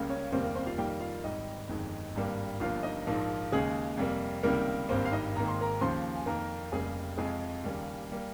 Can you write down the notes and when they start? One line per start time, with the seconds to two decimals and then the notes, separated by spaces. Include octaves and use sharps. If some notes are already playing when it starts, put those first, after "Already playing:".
Already playing: C#2 C#3 G3 A#3
0.09 C#4 C#5
0.32 F1 D#2 C#3 G3 A#3 C4 C5
0.44 A#4
0.55 C4 C5
0.66 F4 F5
0.78 F2 D#3 G3 A#3 G4 G5
1.00 F4 F5
1.24 G#1 G#2 G3 D#4 D#5
1.69 G1 F2 D#3 G#3
2.15 G#1 G2 G3 A#3
2.60 G1 G2 F3 A#3 F4 F5
2.83 D#4 D#5
3.07 A#1 G#2 F3 A#3
3.52 D#2 C#3 G#3 G#4
3.97 F2 C3 G3 A#3
4.43 C#2 C3 D#3 G3 A#3 A#4
4.89 G#1 G2 G3 A#3 C4 C5
5.05 F5
5.12 D#4 D#5
5.35 G#1 G#2 D#3 A#3 A#5
5.48 C6
5.61 A#4 A#5
5.81 D#2 C#3 F3 C5 C6
6.16 G#5
6.26 F2 D#3 A#3 A#4 A#5
6.72 F1 F2 C#3 G3 A#3 G#4 G#5
7.17 F2 C3 F3 G#3 G#4 G#5
7.63 D#2 C#3 G3 A#3
8.12 G3 A#3